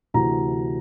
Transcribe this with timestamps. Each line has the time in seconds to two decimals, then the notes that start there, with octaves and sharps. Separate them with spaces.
0.14 D2 C3 E3 A#5